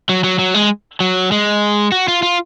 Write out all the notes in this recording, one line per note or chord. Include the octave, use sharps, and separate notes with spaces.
F#3
F#3
F#3
G#3
F#3
G#3
F#4
F4
F4